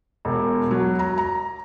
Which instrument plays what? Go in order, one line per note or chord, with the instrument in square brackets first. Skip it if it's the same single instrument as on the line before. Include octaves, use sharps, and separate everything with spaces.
[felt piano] E1
F#3
A#5
A#5